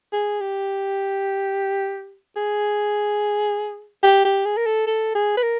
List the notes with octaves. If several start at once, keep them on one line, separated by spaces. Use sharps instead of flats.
G#4
G4
G#4
G4
G4
G#4
A#4
A4
A4
G#4
B4
A#4